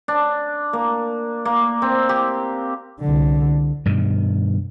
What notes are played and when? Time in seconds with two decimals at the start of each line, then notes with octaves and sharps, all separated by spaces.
0.08 D4
0.73 A#3
1.45 A#3
1.82 C4
2.09 G4
3.00 C2 D3
3.86 G2 B2 D#3